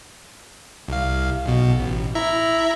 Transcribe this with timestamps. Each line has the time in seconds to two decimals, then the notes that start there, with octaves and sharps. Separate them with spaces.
0.88 C2 F5
1.45 B1 B2
1.80 A1
2.15 E4 E5 A#5